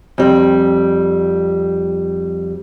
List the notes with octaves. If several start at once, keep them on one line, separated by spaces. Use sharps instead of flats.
F2 G3